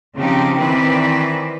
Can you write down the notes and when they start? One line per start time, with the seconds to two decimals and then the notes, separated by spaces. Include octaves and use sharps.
0.16 C#3 F3 C4 D#4 G4
0.55 D#3 E3 C4 D#4 B4 D5